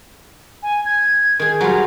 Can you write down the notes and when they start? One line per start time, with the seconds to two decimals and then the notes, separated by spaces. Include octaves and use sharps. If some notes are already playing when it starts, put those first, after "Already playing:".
0.63 G#5
0.85 G#6
1.39 D#3 G#4
1.60 F#3 G3 F4 A#5